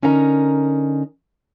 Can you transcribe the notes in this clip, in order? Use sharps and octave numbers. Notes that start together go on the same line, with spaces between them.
D3 C#4 D#4 A#4 F5 A#5